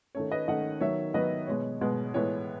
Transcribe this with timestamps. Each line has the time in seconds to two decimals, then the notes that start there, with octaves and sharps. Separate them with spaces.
0.15 D#3 A3 C#4 C#5
0.31 B4 D#5
0.48 D#3 A3 C#4 D#5 F#5
0.81 D#3 F#3 B3 C#5 E5
1.14 D#3 F#3 B3 B4 D#5
1.47 B2 G#3 B3 C#5
1.81 B2 G#3 B3
2.14 A2 E3 G#3 B3 C#5